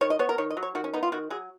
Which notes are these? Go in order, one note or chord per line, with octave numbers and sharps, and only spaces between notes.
D#3 C#5
D#5
B3 C#5
A#4
D#3 C#5
D#5
F#3
C#5
D#3 F#4
C#4
B3 D#4
F4
D#3 F#4
F#3 G#4